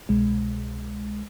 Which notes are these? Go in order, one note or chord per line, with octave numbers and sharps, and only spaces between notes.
C2 B2 G#3